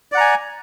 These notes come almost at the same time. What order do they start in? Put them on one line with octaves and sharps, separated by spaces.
D5 F#5 A#5 G#5